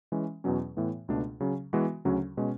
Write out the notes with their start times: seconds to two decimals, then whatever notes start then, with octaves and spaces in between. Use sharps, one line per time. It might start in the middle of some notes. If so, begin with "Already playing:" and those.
0.12 E3 G#3 C#4
0.44 E2 B2 F#3 C#4
0.77 A2 E3 B3
1.08 C#2 B2 A3 D4
1.40 C#3 F#3 C#4
1.73 E3 G#3 B3 F#4
2.05 D2 C#3 F#3 C#4 F#4
2.37 B2 G#3 C#4